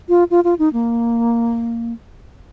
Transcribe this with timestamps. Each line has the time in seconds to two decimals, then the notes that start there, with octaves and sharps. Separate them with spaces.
0.09 F4
0.31 F4
0.44 F4
0.59 D#4
0.73 A#3